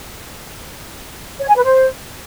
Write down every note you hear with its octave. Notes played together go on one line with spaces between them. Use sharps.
C#5
G#5
B4
C5